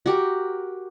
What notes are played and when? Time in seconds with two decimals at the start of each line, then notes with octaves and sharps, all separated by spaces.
0.06 F#4 G4 A#4